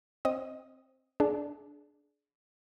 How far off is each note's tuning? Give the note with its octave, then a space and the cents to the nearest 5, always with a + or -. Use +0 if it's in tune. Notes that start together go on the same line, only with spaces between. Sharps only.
C4 +10 D#5 +0
D4 +0 G#4 +30